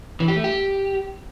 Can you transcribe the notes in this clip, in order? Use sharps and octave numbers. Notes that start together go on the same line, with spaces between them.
E3
G4
A3
G4